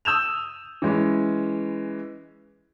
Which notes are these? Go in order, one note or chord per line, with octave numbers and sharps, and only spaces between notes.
D#6 E6 G6 E7 F7
E3 G#3 C#4